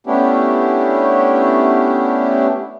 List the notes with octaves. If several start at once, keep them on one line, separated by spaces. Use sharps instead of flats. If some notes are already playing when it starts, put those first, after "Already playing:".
A3 B3 C#4 D4 E4 G4